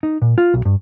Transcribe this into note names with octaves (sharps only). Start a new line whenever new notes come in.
D#4
A#2
F4
B1
G2